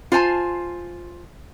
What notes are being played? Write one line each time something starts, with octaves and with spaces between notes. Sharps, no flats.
F4 C5 G#5 A5